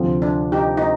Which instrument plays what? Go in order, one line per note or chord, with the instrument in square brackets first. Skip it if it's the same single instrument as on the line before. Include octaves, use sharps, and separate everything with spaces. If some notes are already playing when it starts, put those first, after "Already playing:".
Already playing: [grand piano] D2 C3 F3 C4 F4
[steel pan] D4
D#4 G4
D#4